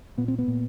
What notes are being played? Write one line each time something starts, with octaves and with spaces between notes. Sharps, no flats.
A#2 B3
C4
B3
A#2